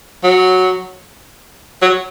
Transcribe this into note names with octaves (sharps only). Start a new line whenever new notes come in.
F#3
F#3